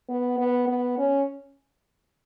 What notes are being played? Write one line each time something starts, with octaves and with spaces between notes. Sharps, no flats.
B3
B3
B3
C#4